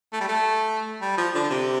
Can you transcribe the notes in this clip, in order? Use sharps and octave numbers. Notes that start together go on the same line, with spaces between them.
A3
G3
A3
G3
F3
D3
C3